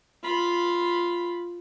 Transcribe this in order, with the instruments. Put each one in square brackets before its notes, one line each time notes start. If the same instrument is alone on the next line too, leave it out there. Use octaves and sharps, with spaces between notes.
[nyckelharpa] F4 B5